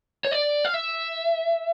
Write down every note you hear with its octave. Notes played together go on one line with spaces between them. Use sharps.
C#5
D5
F5
E5